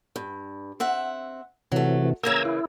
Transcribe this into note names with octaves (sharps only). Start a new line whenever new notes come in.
G2
C4 E5 F#5
C3 E3 F#3 A3
C#3 E3 A#3 A#5 E6 G#6
E4